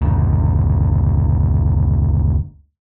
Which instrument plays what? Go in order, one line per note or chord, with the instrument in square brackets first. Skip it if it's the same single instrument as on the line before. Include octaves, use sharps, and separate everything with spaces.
[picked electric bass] F#1 D2